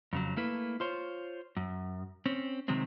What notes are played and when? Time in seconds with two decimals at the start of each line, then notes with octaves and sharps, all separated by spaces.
0.13 F2 C#3 F#3
0.37 A3 A#3 E4 B4
0.80 F4 C5 C#5
1.57 F#2
2.26 C4 C#4
2.68 C3 D#3 F#3 G#3 C4